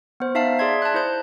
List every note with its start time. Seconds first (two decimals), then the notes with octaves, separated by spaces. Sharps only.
0.20 B3 C5
0.35 D#4 E5 F5 A5 C7
0.59 G#4 D5 E5 C6 G#6
0.82 A5 F#6
0.94 E4 C5 G6